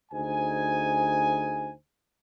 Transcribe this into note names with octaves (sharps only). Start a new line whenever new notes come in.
D2 D#4 G#4 C5 G#5